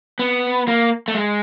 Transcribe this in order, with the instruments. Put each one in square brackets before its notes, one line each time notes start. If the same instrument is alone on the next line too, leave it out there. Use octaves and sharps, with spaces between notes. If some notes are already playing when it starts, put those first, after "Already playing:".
[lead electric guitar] B3
A#3
A3
G#3